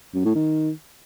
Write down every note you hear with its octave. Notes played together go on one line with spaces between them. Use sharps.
F#2
A2
D#3